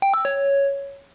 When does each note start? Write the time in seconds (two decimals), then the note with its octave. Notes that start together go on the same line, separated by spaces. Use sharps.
0.02 G5
0.14 E6
0.25 C#5